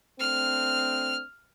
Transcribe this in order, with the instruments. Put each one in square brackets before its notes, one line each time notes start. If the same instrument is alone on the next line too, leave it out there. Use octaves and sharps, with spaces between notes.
[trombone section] A3 C4 D4 [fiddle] F6